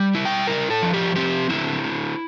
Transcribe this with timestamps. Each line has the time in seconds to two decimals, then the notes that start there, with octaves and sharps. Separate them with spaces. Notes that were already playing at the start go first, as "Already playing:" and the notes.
Already playing: G3
0.15 E4
0.25 G5
0.47 E4 A#4
0.70 A4
0.82 F3
0.94 G4
1.16 C4 G4
1.50 D3 E4
1.84 D3